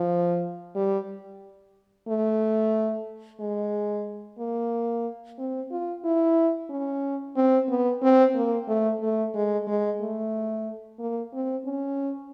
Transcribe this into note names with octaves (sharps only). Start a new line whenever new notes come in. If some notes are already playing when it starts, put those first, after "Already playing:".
Already playing: F3
G3
A3
G#3
A#3
C4
F4
E4
C#4
C4
B3
C4
A#3
A3
A3
G#3
G#3
A3
A#3
C4
C#4